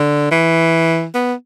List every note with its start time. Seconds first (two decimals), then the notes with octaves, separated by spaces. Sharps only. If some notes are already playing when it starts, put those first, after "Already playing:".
Already playing: D3
0.31 E3
1.15 B3